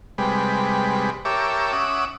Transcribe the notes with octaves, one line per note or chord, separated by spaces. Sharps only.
C3 G3 G#3 B4
G4 A#4 C#5 E5 A5 D6
C#4 E5 F#5 D6 D#6